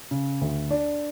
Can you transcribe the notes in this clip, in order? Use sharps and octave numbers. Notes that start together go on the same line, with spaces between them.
C#3
D2
D4